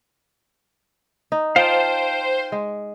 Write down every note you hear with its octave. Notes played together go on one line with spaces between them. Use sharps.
D#4
F4 C5 F5 G5 A5
G#3